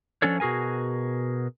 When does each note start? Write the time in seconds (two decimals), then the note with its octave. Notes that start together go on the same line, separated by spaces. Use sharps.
0.22 F3 C#4 D4 A4 C#5
0.40 B2 F#4 G#4 A#4 G#5